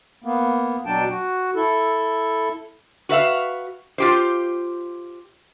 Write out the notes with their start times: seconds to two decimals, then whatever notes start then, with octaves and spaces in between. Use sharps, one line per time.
0.24 A#3 B3
0.86 B2 F#3 D4 G5 A5
1.09 F#4
1.56 E4 A4
3.09 F#4 B4 E5 F5
3.98 F4 G4 C5